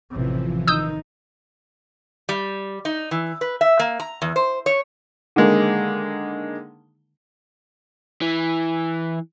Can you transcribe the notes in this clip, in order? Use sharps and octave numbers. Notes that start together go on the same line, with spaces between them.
A1 C3 E3 F3
D#3 D#4 D#6 E6 G6
G3
D#4
E3
B4
E5
A#3
A#5
E2
C5
C#5
D3 D#3 G#3 A#3
E3